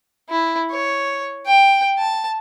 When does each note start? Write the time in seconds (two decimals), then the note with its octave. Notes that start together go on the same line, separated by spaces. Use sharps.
0.30 E4
0.71 C#5
1.47 G5
1.98 A5